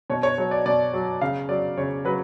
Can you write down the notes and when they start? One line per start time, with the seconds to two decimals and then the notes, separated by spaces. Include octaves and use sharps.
0.10 B2 C#5
0.23 C#5
0.38 F#3 C#5
0.51 D5
0.66 B2 D5
0.94 F#3
1.21 C#3 F5
1.49 F#3 D5
1.78 C#3 C#5
2.05 F#3 B4